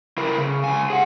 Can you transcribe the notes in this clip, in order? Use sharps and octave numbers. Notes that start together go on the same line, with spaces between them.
E4 A#4
C#3
C#2 G#5
G#4 F#5